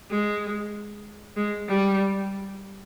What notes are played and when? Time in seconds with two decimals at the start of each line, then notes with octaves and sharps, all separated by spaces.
0.10 G#3
1.36 G#3
1.68 G3